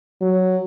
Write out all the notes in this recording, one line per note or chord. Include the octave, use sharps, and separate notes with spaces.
F#3